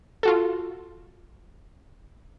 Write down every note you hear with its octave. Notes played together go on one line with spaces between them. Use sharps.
F4 F#4 A4